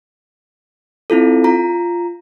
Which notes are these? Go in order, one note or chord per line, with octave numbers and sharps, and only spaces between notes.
C4 E4 F4 A4
F4 A#5